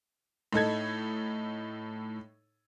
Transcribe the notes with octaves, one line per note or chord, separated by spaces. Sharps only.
A2 D#4 A4 G#6